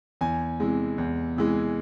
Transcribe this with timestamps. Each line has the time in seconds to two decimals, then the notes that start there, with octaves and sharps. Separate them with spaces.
0.21 E2 G#5
0.60 C3 E3 G#3
0.98 E2
1.36 C3 E3 G#3